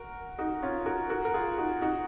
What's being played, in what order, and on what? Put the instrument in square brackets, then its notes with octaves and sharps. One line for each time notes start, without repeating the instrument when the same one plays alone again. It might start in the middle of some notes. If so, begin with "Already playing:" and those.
Already playing: [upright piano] F#4 A#4
D#4 F#4
C#4 F4
F#4 A#4
F#4 A#4
A#4
F4 G#4
D#4 F#4
D#4 F#4